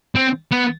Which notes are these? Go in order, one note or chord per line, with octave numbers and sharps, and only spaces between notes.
C4
B3